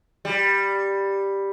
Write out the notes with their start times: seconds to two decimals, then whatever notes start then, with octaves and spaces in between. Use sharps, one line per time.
0.25 G3